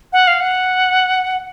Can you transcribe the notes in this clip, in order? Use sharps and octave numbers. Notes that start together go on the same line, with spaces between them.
F#5
F5
F#5